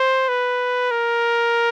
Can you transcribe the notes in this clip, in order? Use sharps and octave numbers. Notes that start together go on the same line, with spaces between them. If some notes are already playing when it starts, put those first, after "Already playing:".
Already playing: C5
B4
A#4